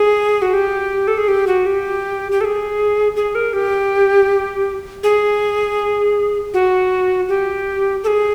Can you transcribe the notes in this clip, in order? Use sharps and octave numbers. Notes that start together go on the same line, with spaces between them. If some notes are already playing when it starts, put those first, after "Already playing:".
Already playing: G#4
F#4
G4
A4
G#4
G4
F#4
G4
G4
A4
G#4
G#4
A#4
G4
G#4
F#4
G4
A4
G#4